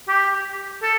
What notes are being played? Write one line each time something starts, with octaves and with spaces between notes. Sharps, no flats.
G4
A4